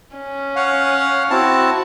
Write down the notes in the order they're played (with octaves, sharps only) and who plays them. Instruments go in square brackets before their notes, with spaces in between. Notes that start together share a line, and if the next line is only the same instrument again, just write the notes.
[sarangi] C#4
[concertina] C#5 F5 F#5
[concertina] C4 E4 A5 [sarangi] F#4